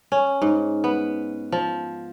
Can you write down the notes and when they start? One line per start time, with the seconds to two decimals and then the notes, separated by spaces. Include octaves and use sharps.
0.12 C#4
0.42 G#2
0.84 B3
1.52 F3